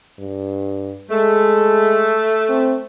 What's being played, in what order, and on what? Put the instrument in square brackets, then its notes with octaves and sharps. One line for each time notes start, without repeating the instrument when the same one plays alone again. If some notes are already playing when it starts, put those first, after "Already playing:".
[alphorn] G2
[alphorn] G#3 [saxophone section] A3
[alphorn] C4